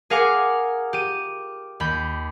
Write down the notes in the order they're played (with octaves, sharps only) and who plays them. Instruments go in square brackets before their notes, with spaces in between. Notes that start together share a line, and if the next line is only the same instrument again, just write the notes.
[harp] G#4 A#4 F5 F#5 G#5 D6
G4 D#7
D#2 B5 G6